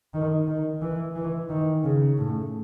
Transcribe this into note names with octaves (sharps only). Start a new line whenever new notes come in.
D#3
D#3
E3
E3
D#3
C#3
A2